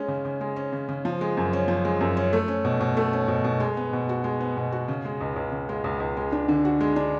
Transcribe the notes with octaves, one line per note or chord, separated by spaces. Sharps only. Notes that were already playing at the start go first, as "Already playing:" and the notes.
Already playing: G#3 C#4
C#3
C#3
G#3
C#4
C#3
C#3
F3
G#3
F#2
C#4
F3
G#3
F#2
C#4
A3
C#4
B2
B2
A3
C#4
B2
B2
G#3
B3
B2
F#4
G#3
B3
B2
F#4
C#3
G#3
C#2
C#2
C#3
G#3
C#2
C#2
G#3
D4
D3
F#4
G#3
D4